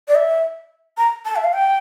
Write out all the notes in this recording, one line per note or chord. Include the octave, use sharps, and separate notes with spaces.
D5
E5
A#5
A5
E5
F5
G5